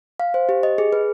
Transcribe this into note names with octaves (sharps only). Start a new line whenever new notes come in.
F5
C5
G4
D#5
G#4
B4